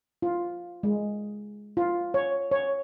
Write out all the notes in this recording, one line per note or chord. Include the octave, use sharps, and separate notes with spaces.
F4
G#3
F4
C#5
C#5